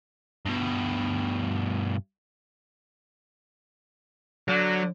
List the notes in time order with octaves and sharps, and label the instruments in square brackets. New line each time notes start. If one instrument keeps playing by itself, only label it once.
[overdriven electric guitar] G2 B2
[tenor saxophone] D3 [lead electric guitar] F#3